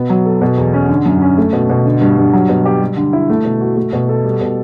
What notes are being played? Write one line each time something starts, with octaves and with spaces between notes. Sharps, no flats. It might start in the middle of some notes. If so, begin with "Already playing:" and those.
Already playing: B2 B3
F#3
A4
B2
E2
C#4
D3
F#2
C#4
A3
B2
B2
D3
G2
G2
F#3
B2
G4
G3
D3
E4
A3
B2
F#4
A3
B2
A4
G3
B2